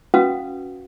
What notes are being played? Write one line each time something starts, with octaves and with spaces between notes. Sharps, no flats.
C#4 F#4 B4 F5 F#5 D#6